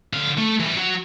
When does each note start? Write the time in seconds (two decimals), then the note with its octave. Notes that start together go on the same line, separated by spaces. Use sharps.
0.13 D3 F5
0.38 A3
0.60 E3 G3
0.77 F#3 F#4